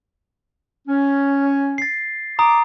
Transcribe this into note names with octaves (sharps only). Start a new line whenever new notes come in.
C#4
A6 C7
A#5 D6 D#6